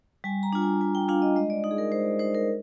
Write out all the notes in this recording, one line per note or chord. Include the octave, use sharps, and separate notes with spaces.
G3 G#5
A#5
D4 F4
G#5
G3 G#5
G5
D4 F4 F5
D#5
G#3 D#5
D5
D#4
G#4
A#4
G#3 C5
D#4 C5
A#4